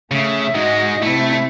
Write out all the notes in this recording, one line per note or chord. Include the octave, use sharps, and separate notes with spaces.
C#3 A3 E5
G#2 G#3 F#4 D#5
C3 A3 E4